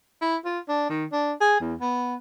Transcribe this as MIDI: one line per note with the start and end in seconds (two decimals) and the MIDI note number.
0.22 0.36 64
0.45 0.59 65
0.69 0.85 62
0.90 1.05 51
1.12 1.33 62
1.41 1.60 68
1.60 1.75 40
1.81 2.15 59